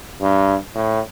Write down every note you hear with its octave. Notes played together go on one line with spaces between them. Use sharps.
G2
A2